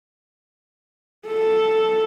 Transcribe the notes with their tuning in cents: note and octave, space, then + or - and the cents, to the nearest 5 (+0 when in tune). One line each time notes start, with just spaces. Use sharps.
A4 +0